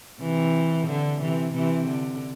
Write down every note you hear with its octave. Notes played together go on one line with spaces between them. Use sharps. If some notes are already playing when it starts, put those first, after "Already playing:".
C3 E3
D3
C3 E3
C3 E3
D3